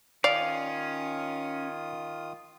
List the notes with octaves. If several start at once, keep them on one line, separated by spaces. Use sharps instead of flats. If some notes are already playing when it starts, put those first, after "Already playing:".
D#3 C#4 F4 D5 F5 D#6